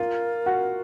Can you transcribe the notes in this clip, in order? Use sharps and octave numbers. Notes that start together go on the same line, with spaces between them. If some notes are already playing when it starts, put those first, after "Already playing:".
Already playing: F4 A#4
F#4